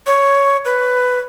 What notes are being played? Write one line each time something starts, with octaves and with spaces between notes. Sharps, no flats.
C#5
B4